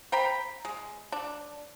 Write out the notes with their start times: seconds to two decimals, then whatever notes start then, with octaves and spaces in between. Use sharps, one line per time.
0.12 C5 G5 A#5 B5
0.65 G#3
1.12 D4